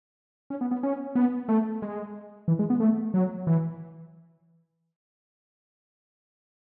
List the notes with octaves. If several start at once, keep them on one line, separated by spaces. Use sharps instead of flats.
C#4
B3
B3
C#4
B3
A3
G#3
E3
G#3
B3
A3
F#3
E3